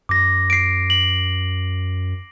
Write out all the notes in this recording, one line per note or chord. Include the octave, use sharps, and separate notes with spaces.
F#2 D6 A#6
C7 D7
F#7